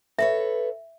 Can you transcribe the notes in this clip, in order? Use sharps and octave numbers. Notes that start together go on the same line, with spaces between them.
A4 B4 C#5 E5